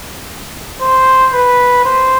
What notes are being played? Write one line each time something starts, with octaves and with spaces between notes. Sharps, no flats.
C5
B4
C5